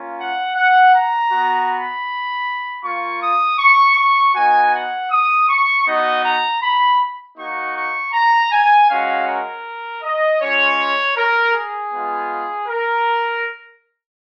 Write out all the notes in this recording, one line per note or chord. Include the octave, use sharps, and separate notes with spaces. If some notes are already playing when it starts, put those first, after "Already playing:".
Already playing: A#3 C#4 F4
F#5
F#5
A#5
B3 F#4
B5
A#3 F4 C#6
D#6
C#6
C#6
B3 D#4 F#4 G#5
F#5
D#6
C#6
B3 D#4 F#4 D#5
A#5
B5
A#3 D#4 F#4 C#6
C#6
A#5
G#5
G#3 C#4 F#4 F5
A#4
D#5
G#3 C#4 F4 C#5
A#4
G#4
G#3 B3 F4
A#4